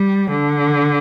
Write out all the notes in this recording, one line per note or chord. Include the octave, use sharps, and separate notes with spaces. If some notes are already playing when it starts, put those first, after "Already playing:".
Already playing: G3
D3